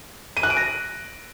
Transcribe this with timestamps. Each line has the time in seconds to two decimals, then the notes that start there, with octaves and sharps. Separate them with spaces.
0.37 D#7
0.43 F#6
0.50 D7
0.57 A#6